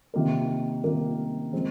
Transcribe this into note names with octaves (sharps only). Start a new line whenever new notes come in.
C3 D#3 A#3 F4 A#4
C3 D#3 A#3 F4 A#4
F3 G#3 C4